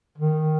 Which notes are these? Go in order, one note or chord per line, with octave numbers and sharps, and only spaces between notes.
D#3